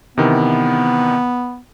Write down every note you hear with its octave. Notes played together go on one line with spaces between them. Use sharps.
C3 D#3 E3 B3